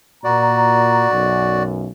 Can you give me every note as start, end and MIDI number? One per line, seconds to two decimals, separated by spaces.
0.24 1.06 46
0.24 1.63 66
0.24 1.63 74
0.24 1.06 82
1.11 1.89 35
1.11 1.89 42